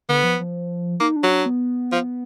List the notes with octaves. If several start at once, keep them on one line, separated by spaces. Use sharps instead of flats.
D3 B3
F3
F3
A#3 D#4
D4
F#3
D4
B3
F3